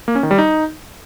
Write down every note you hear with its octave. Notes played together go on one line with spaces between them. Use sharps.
A#3
C#4
D#3
G3
D#4